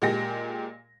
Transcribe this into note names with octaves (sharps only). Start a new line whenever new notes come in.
A#2 G#3 G4 A#6